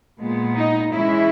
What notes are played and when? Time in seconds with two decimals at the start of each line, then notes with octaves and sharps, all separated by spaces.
0.20 A#2 G#3 B3
0.57 D#4
0.93 E3 G#3 C#4 E4